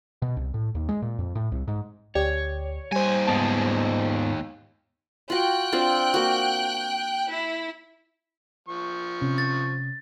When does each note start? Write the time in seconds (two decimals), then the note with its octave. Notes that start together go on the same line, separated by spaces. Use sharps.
0.22 B2
0.37 C2
0.54 A2
0.75 D#2
0.89 G#3
1.02 A#2
1.19 F2
1.35 A2
1.52 C2
1.68 G#2
2.15 D2 G4 C#5 D5
2.92 D#2 G3 C5 G#5
3.27 G#2 B3 A5
5.30 F4 F#4 G5 F#6
5.72 C4 D4 F4
6.14 A#3 F#4
7.28 E4
8.69 F3 C#6
9.21 C3 C#4
9.38 A6